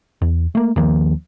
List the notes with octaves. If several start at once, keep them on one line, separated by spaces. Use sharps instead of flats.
E2
A3 A#3
D#2 D#3 F3 A#3